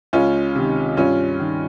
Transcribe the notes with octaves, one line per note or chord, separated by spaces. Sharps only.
C#2 C#4 F4
C3 D#3
G2 C#4 F4
D#3